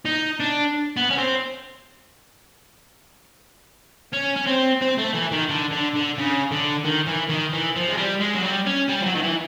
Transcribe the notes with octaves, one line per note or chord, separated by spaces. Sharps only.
D#4
D4
B3
C#4
C4
C#4
C#4
C4
C4
A3
E3
D#3
D3
D3
D3
C#3
D3
D#3
E3
D#3
E3
F3
G#3
G3
G#3
F#3
G3
C#4
G3
F3
F#3
D#3
E3